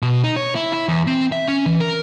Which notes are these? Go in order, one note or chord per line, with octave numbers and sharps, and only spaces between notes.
B2
D#4
C#5
E4
E4
E2
C4
E5
C#4
E3
A#4